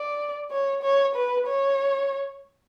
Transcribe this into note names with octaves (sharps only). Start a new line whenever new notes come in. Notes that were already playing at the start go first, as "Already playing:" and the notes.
Already playing: D5
C#5
C#5
B4
C#5